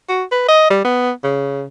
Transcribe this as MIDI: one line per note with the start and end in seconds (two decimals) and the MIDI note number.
0.09 0.23 66
0.31 0.44 71
0.48 0.69 75
0.70 0.82 55
0.84 1.11 59
1.24 1.64 49